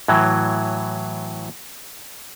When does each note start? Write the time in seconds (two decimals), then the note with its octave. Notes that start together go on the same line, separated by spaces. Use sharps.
0.08 A2 E3 F#3